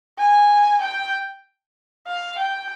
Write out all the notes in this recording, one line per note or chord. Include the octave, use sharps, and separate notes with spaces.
G#5
G5
F5
G5